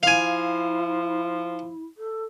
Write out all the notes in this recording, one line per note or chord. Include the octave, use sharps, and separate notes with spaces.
F3 E4 F5 G#5
A4